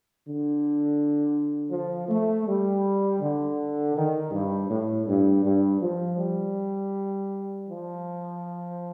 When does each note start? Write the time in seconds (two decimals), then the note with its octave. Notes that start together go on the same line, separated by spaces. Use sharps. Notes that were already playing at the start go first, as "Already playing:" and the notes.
0.23 D3
1.71 F3
2.09 A3
2.46 G3
3.20 D3
3.95 D#3
4.31 G2
4.69 A2
5.07 G2
5.43 G2
5.81 F3
6.18 G3
7.67 F3